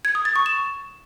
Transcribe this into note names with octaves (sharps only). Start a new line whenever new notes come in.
G#6
D#6
A6
C#6
E7